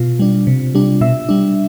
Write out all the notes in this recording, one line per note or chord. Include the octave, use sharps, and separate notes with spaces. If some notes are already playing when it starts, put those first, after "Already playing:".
Already playing: B2 F4
G3 D4
C3
G3 D4
B2 E5
G3 D4